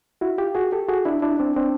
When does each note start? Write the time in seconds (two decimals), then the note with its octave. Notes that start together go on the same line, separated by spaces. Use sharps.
0.21 E4 F#4
0.38 F4 G4
0.55 F#4 G#4
0.72 G4 A4
0.88 F#4 G#4
1.05 D4 E4
1.22 D4 E4
1.39 C4 D4
1.56 C4 D4